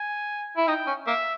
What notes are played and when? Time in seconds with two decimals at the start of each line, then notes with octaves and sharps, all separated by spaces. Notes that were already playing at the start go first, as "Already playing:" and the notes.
Already playing: G#5
0.57 E4
0.67 D#4 G5
0.87 C#4
1.07 A#3 E5